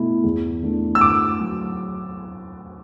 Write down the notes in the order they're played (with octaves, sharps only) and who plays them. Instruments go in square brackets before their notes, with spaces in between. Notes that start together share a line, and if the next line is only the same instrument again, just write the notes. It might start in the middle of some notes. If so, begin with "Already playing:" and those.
Already playing: [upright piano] B2 A3 E4
E2
E3 A3 D4
[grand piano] E6
[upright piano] D2 [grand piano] D6
[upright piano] F#3